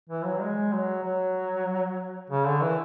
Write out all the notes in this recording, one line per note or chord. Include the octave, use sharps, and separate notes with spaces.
E3
F#3
G#3
F#3
F#3
C#3
D3
E3